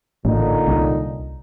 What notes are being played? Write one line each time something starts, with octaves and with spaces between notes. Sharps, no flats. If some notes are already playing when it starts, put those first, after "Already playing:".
A1 A#2 D3 D#4
C2